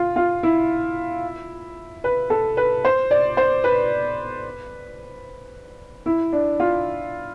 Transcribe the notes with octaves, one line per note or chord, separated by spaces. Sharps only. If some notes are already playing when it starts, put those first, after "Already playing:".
Already playing: F4
F4
E4
B4
A4
B4
C5
D5
C5
B4
E4
D4
F4